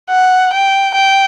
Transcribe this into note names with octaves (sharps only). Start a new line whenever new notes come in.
F#5
G5
G5